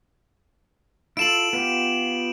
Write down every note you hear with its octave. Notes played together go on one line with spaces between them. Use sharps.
E4 F4 A4 D7 E7 F#7
B3 F4 G4